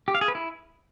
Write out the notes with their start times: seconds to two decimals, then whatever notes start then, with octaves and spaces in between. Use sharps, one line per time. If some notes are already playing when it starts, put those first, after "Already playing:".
0.08 G4
0.15 F5
0.21 G#4
0.28 B4
0.35 E4